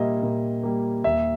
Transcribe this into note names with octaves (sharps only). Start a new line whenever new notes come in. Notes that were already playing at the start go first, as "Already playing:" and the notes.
Already playing: A#2 G3 A#3 D#5 E5
A#2
G3 A#3
D#2 E5